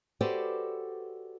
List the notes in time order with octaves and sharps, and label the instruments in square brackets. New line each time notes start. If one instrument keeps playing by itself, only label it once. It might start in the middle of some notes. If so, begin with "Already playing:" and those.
[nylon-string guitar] F#4 G4 A4 B4 C5 D5